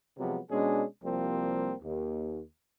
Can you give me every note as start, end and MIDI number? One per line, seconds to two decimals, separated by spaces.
0.18 0.39 48
0.18 0.39 53
0.18 0.39 54
0.18 0.39 56
0.18 0.39 59
0.51 0.84 47
0.51 0.84 56
0.51 0.84 61
0.51 0.84 62
0.51 0.84 68
1.04 1.73 36
1.04 1.73 53
1.04 1.73 55
1.04 1.73 58
1.04 1.73 60
1.83 2.42 39